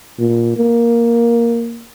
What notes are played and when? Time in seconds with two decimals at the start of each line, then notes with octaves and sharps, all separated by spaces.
0.19 A#2
0.57 A#3